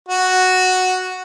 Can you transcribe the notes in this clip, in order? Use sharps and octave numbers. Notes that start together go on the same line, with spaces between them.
F#4